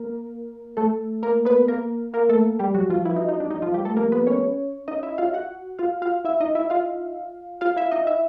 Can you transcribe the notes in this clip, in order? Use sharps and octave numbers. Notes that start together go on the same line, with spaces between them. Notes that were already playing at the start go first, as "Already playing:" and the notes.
Already playing: A#3 A#4
A3 A4
A#3 A#4
B3 B4
A#3 A#4
A#3 A#4
A3 A4
G3 G4
F#3 F#4
F3 F4
E3 E4
D#4
D#4
D4
D#4
F3 F4
G3 G4
A3 A4
A#3 A#4
B3 B4
C#4 C#5
D#4 D#5
E4 E5
F4 F5
F#4 F#5
F4 F5
F4 F5
E4 E5
D#4 D#5
E4 E5
F4 F5
F4 F5
E4 E5
D#4 D#5
E4 E5